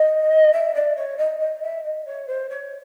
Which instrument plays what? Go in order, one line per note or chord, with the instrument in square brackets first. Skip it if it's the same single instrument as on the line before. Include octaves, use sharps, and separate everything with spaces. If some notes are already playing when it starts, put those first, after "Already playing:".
Already playing: [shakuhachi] D#5
E5
D5
C#5
D#5
D#5
E5
D#5
C#5
C5
C#5